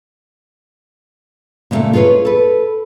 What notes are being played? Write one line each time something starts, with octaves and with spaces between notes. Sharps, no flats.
A#2 C#3 F#3 G3 A3 A#3
F4 G#4 A4 B4 C#5
A4 B4